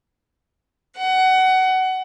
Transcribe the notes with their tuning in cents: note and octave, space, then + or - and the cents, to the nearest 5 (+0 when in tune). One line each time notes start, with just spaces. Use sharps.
F#5 +20